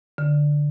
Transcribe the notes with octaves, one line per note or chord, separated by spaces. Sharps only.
D3